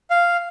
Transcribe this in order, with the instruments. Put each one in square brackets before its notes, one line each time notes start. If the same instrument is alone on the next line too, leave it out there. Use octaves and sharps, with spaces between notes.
[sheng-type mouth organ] F5